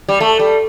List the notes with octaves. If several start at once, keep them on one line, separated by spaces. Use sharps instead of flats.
G3
A3
G3